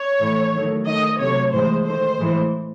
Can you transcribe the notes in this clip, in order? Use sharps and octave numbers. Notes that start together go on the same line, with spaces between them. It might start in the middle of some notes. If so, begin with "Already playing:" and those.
Already playing: C#5
A2 E3 A3
D#3 F#3 A3
D#3 A3 D#5
C3 F#3 A3 C#5
A2 E3 G#3 C5
D#3 A3 C5
A2 E3 G#3